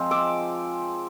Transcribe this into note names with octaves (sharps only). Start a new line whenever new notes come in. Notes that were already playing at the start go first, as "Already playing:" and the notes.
Already playing: F3 G#3 C4
D6 E6